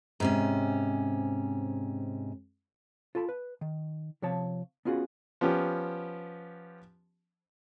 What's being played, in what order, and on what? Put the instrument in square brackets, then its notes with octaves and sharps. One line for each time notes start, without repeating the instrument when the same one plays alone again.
[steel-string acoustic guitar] G#2 C3 C#4
[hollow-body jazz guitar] F4 A4 A5 B5
B4
D#3
C3 F3 C#5 A5
B3 C#4 F4 F#4 G#4
[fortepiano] F3 B3 C#4 G4